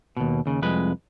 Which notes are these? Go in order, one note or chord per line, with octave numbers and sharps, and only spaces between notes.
D#2 B2
D#2 C#3
C2 F2 G#3 B4